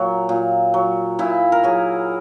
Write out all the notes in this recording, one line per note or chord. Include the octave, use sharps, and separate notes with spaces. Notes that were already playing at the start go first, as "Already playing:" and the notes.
Already playing: A#2 F#3
A#2
F#3
A#2 E4
A#4
F#3 G#4